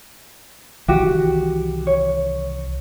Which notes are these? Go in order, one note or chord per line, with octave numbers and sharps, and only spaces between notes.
C2 D#3 E3 F#4 G4
C#5